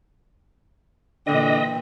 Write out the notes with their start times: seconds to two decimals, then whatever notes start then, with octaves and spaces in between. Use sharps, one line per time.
1.27 A#2 D3 E3 D#5 G5